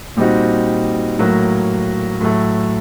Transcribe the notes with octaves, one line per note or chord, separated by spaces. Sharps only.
A#2 G3 C4 D#4 F#4
A2 F#3 A#3
A2 F#3 A3